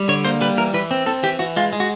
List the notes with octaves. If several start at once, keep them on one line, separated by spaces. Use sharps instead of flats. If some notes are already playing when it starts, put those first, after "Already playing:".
Already playing: G3
D3 C#5
A#3 C5
G3 B4
E3 A#4
E3 B4
C4
C4 A4
E3 G4
E3 F#4
G#3 F4
G#3
F#4